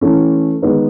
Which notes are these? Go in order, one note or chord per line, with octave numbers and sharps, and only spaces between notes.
E3 A3 C#4
D#3 G#3 B3 D#4